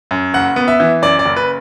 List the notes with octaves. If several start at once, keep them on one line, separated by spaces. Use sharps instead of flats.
F#2
F#1 F#5
B3
E5
E3
F#2 D5
D5
F#1
B4